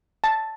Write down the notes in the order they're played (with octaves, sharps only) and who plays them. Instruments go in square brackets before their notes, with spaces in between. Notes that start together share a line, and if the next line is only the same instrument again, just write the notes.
[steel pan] A5